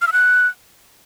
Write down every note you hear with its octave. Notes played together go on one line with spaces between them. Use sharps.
F6
E6
F#6